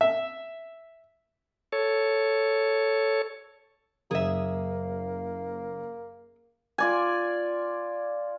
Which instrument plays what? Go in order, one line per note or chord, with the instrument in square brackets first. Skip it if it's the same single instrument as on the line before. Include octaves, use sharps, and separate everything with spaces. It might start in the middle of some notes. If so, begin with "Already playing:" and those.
[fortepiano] E5
[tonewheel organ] A4 C#5
[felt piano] F#1 [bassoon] A#3 [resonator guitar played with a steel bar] G#4 E5
[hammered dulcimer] F4 D5 G#5